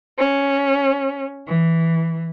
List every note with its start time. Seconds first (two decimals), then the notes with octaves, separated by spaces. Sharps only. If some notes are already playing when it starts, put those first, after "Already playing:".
0.18 C#4
1.46 E3